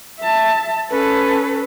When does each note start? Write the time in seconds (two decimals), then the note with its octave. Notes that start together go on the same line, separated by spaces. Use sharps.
0.20 E5 A5
0.90 C#4 A4 B4